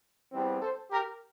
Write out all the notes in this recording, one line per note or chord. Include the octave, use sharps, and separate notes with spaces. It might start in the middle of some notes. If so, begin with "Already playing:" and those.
E2 E3 G3 C4
A4 C5
G4 A#4